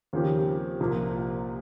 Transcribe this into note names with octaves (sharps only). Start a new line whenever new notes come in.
D#2 C#3 F3 C4 G4
C2 A#2 F3 A#3